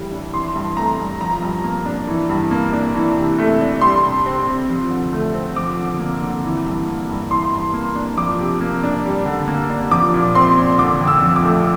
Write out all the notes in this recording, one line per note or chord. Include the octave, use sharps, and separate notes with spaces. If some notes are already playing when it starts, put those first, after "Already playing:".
Already playing: A2 E3 G3
D4
E3 C6
G2
A3 A#5
G2
F3 A#5
G2
A#3
D4
E3
G2
A#3
D4
E3
C3
A3
D4
G3 C6
C3
C4
C3
F3
D3
A3
C4
F3 D6
D3
A#3
D3
E3
G2
A#3
G2
E3 C6
G2
A#3
D4
F3 D6
C3
A#3
D4
G3
D3
A#3
D4
F3 D6
A#2
C4 C6
A#2
D3 D6
F2
E6
F3
D6
A3